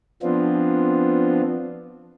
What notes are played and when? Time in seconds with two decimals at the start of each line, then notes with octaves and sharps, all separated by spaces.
0.23 F3 B3 C4 D4 F4